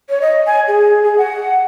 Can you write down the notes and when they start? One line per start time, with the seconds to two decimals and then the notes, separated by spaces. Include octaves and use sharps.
0.09 C#5
0.21 D#5
0.46 G#5
0.68 G#4
1.03 G#4
1.18 F#5